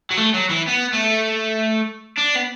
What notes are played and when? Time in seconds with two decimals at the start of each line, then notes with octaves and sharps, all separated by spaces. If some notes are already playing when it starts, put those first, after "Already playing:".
0.11 F#3
0.17 A3
0.34 F#3
0.50 E3
0.67 B3
0.93 A3
2.17 D4
2.35 B3